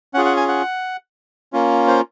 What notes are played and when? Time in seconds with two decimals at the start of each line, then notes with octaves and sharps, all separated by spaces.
0.14 C#4 F#5
0.17 F4 G#4
0.25 F#5
0.37 G#5
0.48 F#5
1.53 A#3 C#4 F4
1.88 C5